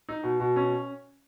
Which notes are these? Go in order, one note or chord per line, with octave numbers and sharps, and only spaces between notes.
D#4
B2
B2
C#4